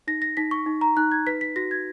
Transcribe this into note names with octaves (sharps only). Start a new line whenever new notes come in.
D#4 A#6
A#6
D#4 B6
C#6
D#4
A#5
D#4 F#6
G#6
B4 B6
B6
F#4 A#6
G#6